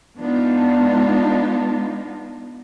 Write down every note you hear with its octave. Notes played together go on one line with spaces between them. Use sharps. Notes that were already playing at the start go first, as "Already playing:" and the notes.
G#3 B3 D4 D#4 F4